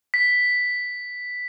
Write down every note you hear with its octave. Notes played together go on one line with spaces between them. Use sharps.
B6